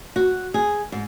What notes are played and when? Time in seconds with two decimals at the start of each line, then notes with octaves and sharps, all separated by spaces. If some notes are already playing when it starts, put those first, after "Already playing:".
0.16 F#4
0.54 G#4
0.92 G#2